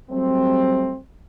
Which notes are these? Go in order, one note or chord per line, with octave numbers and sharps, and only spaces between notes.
F#3 G3 A3 C4